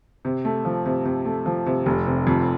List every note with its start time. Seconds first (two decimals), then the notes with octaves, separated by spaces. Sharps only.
0.25 C3
0.45 A3
0.65 F3
0.86 C3
1.05 C3
1.25 A3
1.46 F3
1.66 C3
1.86 F1
2.07 C3
2.27 F2